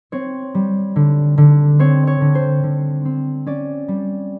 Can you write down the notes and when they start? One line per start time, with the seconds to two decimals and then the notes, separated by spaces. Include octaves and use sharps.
0.12 C4 C#5
0.54 G3
0.96 D3
1.38 D3
1.79 C4 C#5
2.07 C#5
2.21 D3
2.35 C5
2.63 D3
3.05 C4
3.46 C#4 D5
3.88 G3